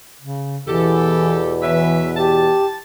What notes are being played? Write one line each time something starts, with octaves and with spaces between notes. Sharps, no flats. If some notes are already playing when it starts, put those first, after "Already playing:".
C#3
E2 B2 E3 G4 A4
E3 B4 C#5 E5
G4 A5